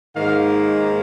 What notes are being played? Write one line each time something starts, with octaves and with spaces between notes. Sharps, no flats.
G#2 D#3 A#3 F5